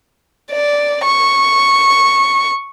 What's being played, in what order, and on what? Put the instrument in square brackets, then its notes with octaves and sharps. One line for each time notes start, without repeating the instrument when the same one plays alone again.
[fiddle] D5
C#6